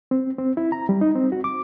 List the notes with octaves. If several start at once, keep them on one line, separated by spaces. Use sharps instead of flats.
C4
C4
E4
A#5
G3
D#4
C4
F#4
D6